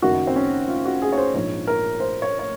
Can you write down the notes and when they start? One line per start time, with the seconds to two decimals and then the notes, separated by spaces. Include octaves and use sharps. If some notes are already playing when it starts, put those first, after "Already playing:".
0.02 F#1 F#2 D#3 F#4
0.27 C4
0.36 C#4
0.68 F4
0.86 F#4
1.02 G#4
1.12 C#5
1.17 C5
1.34 A#1 G#2 F3 C#5
1.67 A#4
2.00 C5
2.22 C#5
2.39 C#5